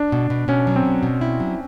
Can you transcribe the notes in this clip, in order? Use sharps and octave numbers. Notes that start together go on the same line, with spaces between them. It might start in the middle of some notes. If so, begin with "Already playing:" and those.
Already playing: D4
B2
B2
B2 C#4
F#3
C4
B2
B2
E4
F#3